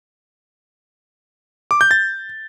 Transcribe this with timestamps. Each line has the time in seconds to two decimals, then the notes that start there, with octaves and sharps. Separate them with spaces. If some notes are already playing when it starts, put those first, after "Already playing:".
1.71 D6
1.81 G6
1.91 A6